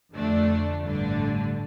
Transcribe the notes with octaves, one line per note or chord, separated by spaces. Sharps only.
F2 D3 A3 D4
A1 G2 D3 A3 D4